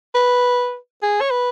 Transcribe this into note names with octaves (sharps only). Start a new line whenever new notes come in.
B4
G#4
C#5
B4